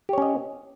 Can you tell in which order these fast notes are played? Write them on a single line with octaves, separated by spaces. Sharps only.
G4 C#5 C#4 D#5